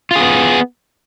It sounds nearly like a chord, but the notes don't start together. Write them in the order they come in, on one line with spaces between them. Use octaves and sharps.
F4 G#4 B3